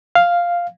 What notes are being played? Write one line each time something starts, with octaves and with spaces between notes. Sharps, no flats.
F5